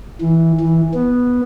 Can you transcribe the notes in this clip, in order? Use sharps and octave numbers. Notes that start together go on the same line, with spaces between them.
E3
E3
B3